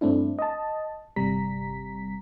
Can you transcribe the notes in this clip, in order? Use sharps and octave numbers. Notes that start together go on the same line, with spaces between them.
G2 A3 C4 D4 E4
D#5 A5
G1 C3 G3 A#5 B6